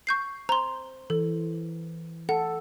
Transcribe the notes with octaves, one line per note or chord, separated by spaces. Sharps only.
C#6 G6 C7
C5 A#5 C6
E3 A4
A4 F#5